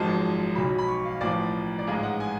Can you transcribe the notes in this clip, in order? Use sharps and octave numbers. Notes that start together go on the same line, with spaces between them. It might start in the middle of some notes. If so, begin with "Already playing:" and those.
Already playing: G#1 F#2 F3 G#3 A5
B1 B2 F#3 B5
B5
C#6
F5
A1 A2 F3 D5
D5
A1 G#2 G#3 F5
F#5
G#5